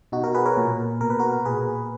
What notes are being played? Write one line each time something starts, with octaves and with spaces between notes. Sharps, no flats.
B2 D#4 F#4
F#4 A#4
G#4 B4
A#4 C#5
A#2
B2 A#4
B4
F#4 A#4
A#2 G#4 B4